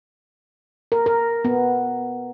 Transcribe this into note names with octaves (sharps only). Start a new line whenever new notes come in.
A#4
A#4
B3